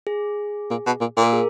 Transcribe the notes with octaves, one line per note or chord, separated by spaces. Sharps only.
G#4
A#2
B2
A#2
A#2
A#4
G#4